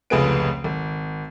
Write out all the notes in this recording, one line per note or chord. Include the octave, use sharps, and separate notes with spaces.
F1 C#2 G#4 B4 D7
G#1